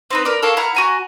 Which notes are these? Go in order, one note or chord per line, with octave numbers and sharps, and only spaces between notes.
C4 D#4 B4
A#4 B4 D5
A4 A#4 C#5 F5
E4 F#5 A#5 F6
F#4 G#5 A#5